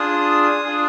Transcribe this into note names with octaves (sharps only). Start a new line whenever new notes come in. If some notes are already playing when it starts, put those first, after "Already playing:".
Already playing: D4 F4 G#4 D#6
D4 F4 G#4